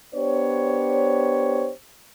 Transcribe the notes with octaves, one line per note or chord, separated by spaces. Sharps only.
B3 D4 G4 C5 C#5